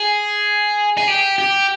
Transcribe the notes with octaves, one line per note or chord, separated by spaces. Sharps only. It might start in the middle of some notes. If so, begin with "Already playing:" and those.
Already playing: G#4
G#4
G4
G4